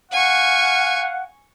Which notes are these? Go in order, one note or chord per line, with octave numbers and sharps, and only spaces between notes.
F5 F#5 G#5 C#6